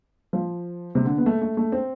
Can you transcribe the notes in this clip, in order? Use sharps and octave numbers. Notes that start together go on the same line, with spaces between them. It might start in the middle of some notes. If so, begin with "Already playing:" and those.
F3
C3
D3
B3
A3
A3
A3
C4